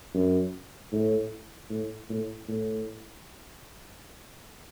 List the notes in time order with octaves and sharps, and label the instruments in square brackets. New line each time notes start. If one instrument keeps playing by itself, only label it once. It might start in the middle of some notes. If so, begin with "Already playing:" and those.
[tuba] F#2
A2
A2
A2
A2